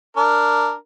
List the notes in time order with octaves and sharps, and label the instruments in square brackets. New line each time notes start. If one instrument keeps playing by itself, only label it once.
[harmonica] D4 A#4